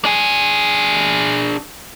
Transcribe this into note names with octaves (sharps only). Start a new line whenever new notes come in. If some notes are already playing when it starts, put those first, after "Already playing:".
D4 G#4